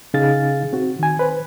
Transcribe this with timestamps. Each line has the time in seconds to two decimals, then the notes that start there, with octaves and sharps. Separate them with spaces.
0.14 C#3 D#4 G#4 F5 A6
0.73 C4 F#4
0.99 D#3 G#5
1.19 B4 C5